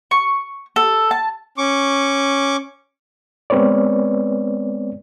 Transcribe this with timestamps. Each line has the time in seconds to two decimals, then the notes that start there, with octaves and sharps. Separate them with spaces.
0.11 C#6
0.76 A4
1.11 A5
1.58 C#4 C#6 D6
3.50 G#3 B3 C4 B4 C#5 D5